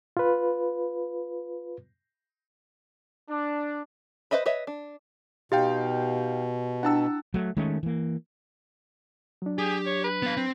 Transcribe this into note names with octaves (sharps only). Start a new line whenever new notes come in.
F4 B4
D4
B4 C5 D#5 E5 B5
B4 C#5 D#5 E5
D4
B2 D#4 G4 F5 G5
D4 E4 F#5 G5 A5 E6
F#3 A3
D#3 G#3 A3 C#4
E3 A#3
F#3 D4
G4 G#4
C#5
B4
B3 F5
C4